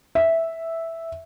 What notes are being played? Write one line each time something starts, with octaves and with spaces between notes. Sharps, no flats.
E5